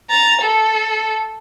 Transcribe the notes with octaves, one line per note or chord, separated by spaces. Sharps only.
A#5 A6
A4